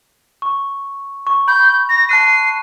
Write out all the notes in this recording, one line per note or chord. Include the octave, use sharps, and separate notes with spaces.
C#6
C#6
B5 G6
A#6
A5 F#6 C7 D#7